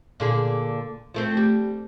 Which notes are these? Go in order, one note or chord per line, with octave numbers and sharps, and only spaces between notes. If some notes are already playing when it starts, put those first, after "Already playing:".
A#2 D3 G#4
F3 A3 C4
G3